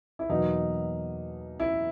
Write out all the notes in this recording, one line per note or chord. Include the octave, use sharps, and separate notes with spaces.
E4
E2 B2 F#3 A#3 D#4
E4